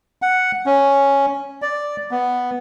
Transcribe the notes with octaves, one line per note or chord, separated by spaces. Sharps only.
F#5
C#4
D5
B3